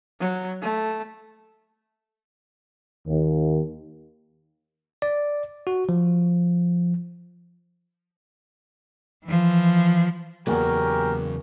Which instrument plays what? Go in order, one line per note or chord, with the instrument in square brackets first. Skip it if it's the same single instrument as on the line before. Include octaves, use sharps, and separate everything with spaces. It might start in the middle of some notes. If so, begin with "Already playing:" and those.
[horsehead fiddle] F#3
A3
[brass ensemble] D#2
[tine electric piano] D5
F#4
F3
[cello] E3 F3
[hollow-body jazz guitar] B1 E2 [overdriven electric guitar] C#3 F#3 [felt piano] A#3 [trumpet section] C#4 G4 A#4